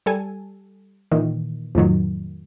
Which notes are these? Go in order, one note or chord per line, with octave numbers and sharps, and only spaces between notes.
G3 A4 G#5
A#2 D#3 E3
F2 A2 D#3 F#3